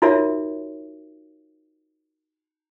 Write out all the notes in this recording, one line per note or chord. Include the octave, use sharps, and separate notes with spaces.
D#4 F4 F#4 A#4 C#5 E5